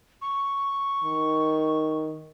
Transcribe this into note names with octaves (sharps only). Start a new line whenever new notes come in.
C#6
D#3